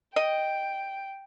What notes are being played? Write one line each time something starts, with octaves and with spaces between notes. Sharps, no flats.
D#5 G5